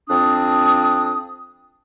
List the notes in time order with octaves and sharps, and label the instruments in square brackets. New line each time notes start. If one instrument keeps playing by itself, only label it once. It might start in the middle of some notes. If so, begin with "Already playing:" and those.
[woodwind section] F2 C4 D4 D#6